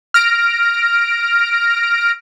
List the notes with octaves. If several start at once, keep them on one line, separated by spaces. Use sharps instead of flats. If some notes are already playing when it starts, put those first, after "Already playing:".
F6 A#6 D7